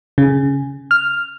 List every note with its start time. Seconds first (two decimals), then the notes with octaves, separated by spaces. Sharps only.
0.18 C#3
0.91 F6